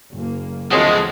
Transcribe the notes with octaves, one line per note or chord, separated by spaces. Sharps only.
F#1 F#2 A#3
D2 E3 F3 G#3 A3 C4 F#4